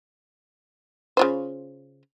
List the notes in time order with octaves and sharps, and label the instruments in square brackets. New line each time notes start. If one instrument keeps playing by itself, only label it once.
[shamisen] C#3 F4 C5